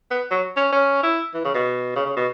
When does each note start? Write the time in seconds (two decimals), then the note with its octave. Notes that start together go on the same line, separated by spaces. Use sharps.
0.11 B3
0.31 F#3
0.57 C#4
0.73 C#4
1.03 E4
1.34 E3
1.45 C#3
1.54 B2
1.96 C#3
2.06 C#3
2.16 B2